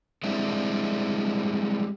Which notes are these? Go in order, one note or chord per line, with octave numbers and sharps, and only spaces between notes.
G3 G#3 C4 D4 E4